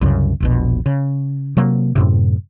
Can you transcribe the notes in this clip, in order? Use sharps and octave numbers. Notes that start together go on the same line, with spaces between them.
C2 F#2 C#3
E1 A#1 B2
C#3
C3 F#3 A#3
F#2 A2 C3